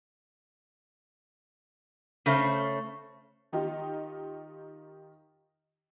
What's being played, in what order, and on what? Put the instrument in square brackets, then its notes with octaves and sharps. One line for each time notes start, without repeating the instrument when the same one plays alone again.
[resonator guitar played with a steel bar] C#3 A3 C#4 C5
[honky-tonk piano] D#3 D#4 F4 G4 D#5